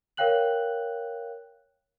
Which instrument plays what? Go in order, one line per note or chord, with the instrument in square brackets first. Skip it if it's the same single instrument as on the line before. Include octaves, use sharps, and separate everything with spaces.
[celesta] A#4 C#5 F5 G5 F#6 F#7